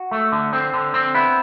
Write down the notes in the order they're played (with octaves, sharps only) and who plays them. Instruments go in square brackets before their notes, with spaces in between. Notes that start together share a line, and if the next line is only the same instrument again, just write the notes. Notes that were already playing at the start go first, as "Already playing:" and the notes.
Already playing: [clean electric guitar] F#4
A3
D3
C4
D3
C4
B3 E4